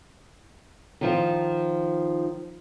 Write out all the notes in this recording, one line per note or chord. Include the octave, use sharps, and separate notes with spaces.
D#3 F3 F4